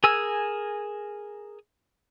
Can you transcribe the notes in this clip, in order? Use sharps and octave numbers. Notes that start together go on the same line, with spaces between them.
G#4 A#4 G#5 E6